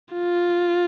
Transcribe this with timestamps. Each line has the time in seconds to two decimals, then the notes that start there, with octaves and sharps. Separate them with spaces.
0.13 F4